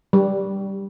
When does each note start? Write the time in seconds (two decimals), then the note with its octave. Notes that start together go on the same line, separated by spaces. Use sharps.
0.13 G3